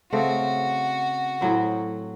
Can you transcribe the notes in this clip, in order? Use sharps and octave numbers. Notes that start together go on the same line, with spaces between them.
C#3 A3 C4 F#4
A2 F#3 C4